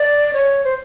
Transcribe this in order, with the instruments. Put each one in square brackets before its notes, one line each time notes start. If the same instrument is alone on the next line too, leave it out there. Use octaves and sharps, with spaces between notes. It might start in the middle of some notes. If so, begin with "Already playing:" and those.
Already playing: [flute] D5
C#5
C5